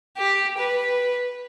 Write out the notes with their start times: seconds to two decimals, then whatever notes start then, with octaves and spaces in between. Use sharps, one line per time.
0.17 G4
0.58 B4